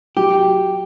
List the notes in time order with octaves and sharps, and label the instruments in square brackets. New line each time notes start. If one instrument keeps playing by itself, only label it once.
[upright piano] F#3 [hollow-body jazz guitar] G4